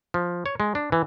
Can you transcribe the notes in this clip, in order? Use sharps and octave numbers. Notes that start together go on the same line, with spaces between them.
F3
C#5
G#3
D4
E3